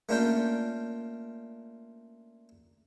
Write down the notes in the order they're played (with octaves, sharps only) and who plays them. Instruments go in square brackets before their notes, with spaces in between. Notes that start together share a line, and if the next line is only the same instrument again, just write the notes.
[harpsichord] A3 A#3 C#4 D4 F4 G5